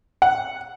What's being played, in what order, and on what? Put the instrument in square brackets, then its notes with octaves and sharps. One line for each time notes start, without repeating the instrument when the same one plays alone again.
[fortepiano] F#5